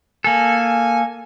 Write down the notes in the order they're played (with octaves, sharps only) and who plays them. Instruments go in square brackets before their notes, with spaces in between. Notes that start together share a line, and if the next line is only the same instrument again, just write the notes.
[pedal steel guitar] A#3 A4 [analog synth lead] G#5